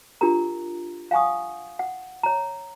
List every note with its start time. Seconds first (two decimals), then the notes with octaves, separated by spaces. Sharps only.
0.21 D4 F4 G4 A#4 A#5
1.11 F5 F#5 G#5 C#6 D#6
1.79 F#5
2.23 C#5 A#5